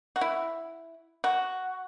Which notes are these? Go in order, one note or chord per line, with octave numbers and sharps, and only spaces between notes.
F#4
E4
F#4